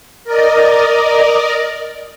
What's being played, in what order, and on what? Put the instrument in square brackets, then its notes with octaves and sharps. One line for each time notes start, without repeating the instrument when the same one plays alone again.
[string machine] A#4 D5 D#5